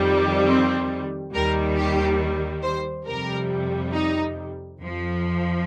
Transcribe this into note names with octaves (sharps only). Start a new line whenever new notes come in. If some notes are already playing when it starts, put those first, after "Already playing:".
Already playing: F2 D#3 G3
C4
D#2 D#3 G3 A#4
G4
C5
F2 C3 G3 A#4
D#4
F2 F3